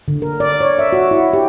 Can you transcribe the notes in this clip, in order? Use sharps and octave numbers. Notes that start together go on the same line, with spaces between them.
D3
A#4
D5
C#5
E5
F#4
E4
G4